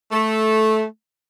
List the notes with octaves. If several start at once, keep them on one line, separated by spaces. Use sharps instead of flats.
A3